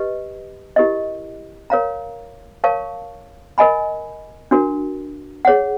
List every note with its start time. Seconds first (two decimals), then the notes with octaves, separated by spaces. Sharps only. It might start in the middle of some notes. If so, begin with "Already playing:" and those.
Already playing: G4 B4 D#5
0.76 E4 G4 A#4 D#5
1.70 A#4 C#5 F5 A#5
2.64 A#4 C#5 F5 A5 C#6
3.58 A#4 D#5 G#5 B5
4.51 D4 F#4 A#4
5.45 G#4 C#5 F#5